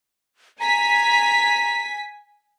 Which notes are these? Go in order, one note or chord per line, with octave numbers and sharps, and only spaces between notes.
G#5 A#5 B6